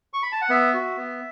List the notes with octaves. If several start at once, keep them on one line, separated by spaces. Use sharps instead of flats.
C#6
B5
A5
F#5
B3 E5
F#4
B3